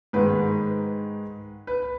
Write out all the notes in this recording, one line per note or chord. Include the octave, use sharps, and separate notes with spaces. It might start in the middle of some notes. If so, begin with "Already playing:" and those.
G#2 D#3 G#3 B4
B4